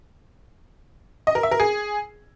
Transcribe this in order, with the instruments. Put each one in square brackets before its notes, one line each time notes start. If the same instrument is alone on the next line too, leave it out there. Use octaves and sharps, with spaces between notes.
[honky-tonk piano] D#5
A#4
E5
A#4
G#4